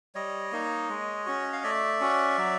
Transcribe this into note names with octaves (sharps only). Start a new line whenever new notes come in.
G3 C#5 D#5
A#3 D#4
G#3
C#4 F#4
F5
A3 D5 E5
C#4 F#4
F#3